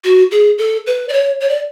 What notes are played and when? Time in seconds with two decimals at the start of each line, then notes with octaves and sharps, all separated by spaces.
0.04 F#4
0.31 G#4
0.58 A4
0.87 B4
1.09 D5
1.13 C#5
1.41 C#5
1.49 D5